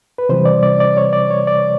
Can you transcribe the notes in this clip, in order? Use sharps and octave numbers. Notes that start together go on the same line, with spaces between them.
B4
C3 E3 G3 C5
D5
D5
D5
C#5
D5
C#5
D5